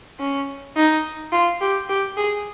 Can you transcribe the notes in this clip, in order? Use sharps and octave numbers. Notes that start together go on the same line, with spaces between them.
C#4
D#4
F4
G4
G4
G#4